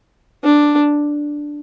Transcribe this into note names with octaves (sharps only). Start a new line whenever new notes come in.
D4